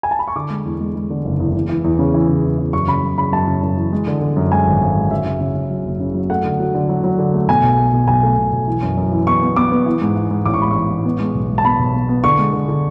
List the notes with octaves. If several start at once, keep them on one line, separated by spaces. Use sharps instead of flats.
G#5
A5
B5
C#6
D3 D6
G#3
E2
G#3
G#3
D3
F#1
E2
E2
E3
E2
C#3
E3
C#3
E2
E3
F#2 C#6
C#3 B5
F#2
C#3 B5
F#2 A5
C#3
F#2
E3
G#3
D3
D3
F#2
G#3 G#5
G#1
G#1
G#3
F#2 E5
C#3
C#3
C#3
F#3
F#1
C#3
F#3
A3 F#5
D3
F#3
D3
F#3
F#3
D3
A3
B2 G#5
B1
A3
B2
B1 G#5
A3
B2
B1
E3
F#2
F#2
E3
B3 C#6
B3
B3 D6
B3
E3
G#2
E3
G#2
A1 D6
C#6
G#2 B5
E3 C#6
A1
B3
G#3
B1
G#3
A5
B3 B5
B1
B3
B3
D3 C#6
G#3
D3
D3